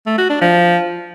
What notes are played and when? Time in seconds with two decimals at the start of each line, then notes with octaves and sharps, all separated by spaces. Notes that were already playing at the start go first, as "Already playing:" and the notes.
0.06 A3
0.18 F#4
0.30 D4
0.41 F3